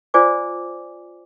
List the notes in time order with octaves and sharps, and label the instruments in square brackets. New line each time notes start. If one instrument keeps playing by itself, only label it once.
[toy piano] F4 C5 D5 G#5 D6